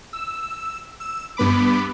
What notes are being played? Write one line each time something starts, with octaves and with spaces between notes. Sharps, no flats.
E6
E6
G2 B3 B5 D6